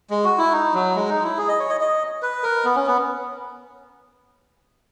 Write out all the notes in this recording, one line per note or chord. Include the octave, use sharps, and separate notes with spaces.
G#3
F#4
E4
D#4
F#3
G#3
D#4
E4
G#4
D#5
C#5
D#5
D#5
B4
A#4
B3
C#4
B3